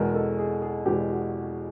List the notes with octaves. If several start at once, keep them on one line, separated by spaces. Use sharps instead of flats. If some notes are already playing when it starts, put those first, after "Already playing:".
Already playing: E2 B2 G#3 A#4
A4
G#4
G#4
E2 B2 G#3 G4
F#4